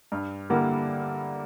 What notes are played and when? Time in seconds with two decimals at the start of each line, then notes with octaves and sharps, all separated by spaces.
0.12 G2
0.50 D3 G3 A#3 E4